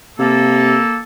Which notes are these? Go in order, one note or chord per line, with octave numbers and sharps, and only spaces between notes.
C3 A#3 A4